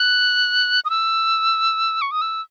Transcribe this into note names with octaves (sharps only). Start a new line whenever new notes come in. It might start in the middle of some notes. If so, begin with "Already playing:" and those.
Already playing: F#6
D#6
E6
C#6
D#6
E6